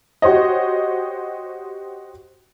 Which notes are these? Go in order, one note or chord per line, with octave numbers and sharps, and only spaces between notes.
F#4 G4 C5 C#5 D#5